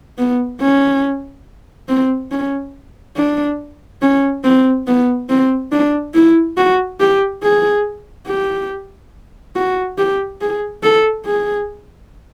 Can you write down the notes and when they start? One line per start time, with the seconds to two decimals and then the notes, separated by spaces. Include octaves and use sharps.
0.18 B3
0.61 C#4
1.88 C4
2.32 C#4
3.16 D4
4.02 C#4
4.44 C4
4.87 B3
5.29 C4
5.72 D4
6.14 E4
6.57 F#4
7.00 G4
7.42 G#4
8.28 G4
9.55 F#4
9.98 G4
10.41 G#4
10.83 A4
11.26 G#4